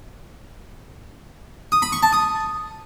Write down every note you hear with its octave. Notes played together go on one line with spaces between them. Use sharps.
D#6
B5
C#6
A5
D#6